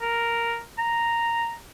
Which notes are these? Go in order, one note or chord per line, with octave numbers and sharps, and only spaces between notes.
A#4
A#5